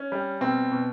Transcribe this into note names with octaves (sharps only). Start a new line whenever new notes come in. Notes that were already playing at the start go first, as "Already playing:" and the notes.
Already playing: C#4
G3
B2 C4
B2